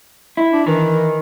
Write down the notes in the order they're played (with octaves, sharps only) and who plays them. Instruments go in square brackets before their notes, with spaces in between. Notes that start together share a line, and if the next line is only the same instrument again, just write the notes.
[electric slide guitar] E4
[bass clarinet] D4
[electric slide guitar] D#3 [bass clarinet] E3